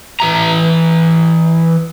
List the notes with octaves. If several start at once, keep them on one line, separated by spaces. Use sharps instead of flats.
E3 E5 A#5